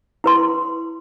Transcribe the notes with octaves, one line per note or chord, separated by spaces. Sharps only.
E4 B4 C6